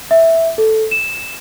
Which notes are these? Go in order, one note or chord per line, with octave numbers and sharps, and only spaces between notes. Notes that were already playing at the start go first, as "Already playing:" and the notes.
E5
A4
E7